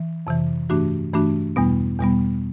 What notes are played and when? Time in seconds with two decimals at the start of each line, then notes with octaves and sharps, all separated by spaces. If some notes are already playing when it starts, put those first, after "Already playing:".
Already playing: E3
0.27 F2 C3 E3
0.70 G2 E3 A3 D4 F#4
1.13 G2 E3 A3 D4 F#4
1.56 E2 B2 G3 B3
1.99 E2 B2 G3 B3